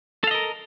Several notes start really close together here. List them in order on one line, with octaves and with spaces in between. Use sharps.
A4 F5 D#5 A#4